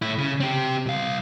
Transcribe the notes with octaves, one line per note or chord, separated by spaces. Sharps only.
A2 E4
C#3
C4 G4
C2 F5